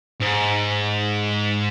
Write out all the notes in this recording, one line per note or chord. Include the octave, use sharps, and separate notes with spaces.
G#2